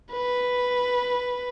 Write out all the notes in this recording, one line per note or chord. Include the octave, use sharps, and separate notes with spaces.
B4